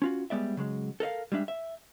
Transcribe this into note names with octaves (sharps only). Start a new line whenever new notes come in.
C#4 F4 F#4
G3 G#3 B3 D5 E5
C#3 F#3 G#3
A4 A#4 D#5 F5
G3 G#3 D4 E5
E5